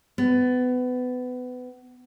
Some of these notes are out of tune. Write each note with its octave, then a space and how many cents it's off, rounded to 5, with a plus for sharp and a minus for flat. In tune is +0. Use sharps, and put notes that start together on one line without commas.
B3 +25